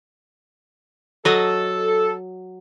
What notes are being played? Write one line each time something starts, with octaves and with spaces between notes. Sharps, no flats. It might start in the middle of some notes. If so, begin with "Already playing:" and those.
F#3 A4 D#5